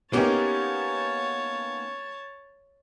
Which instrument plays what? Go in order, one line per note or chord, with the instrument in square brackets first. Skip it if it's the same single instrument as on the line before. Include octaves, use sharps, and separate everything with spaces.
[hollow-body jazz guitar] A#3 G4 [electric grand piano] B3 C#4 D#4 [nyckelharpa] C#5 A5